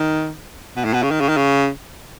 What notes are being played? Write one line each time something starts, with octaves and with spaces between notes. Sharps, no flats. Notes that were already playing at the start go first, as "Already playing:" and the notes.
Already playing: D#3
B2
A2
B2
C#3
D#3
C#3
D#3
C#3